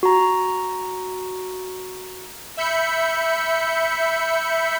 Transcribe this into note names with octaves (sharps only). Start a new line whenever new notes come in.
F#4 A#5
E5 B5 G6 C#7